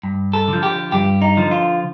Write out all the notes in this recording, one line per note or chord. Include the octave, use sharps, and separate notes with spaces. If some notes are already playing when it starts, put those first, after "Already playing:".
G2
A4
D3 F3
G4
G2 G4
D#4
D3 F3
F4